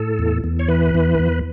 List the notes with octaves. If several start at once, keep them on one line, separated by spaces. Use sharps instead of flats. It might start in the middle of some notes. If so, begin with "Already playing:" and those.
Already playing: A2 A4
E2
E2
C#5
E3 B4
E2
E2